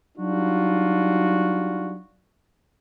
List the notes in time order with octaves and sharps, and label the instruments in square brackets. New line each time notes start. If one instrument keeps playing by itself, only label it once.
[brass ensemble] F#3 G3 D4 D#4 F4 F#4